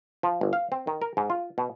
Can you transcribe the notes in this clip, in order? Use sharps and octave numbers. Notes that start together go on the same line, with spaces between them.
F3
G1
F5
C4
D#3
A#4
G#2
F4
B2